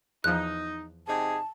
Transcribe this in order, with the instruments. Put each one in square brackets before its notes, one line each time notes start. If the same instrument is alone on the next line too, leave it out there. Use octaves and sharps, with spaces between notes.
[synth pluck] E2 F3 [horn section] D#4 [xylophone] F#6
[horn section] C3 D#4 G#4 [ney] A5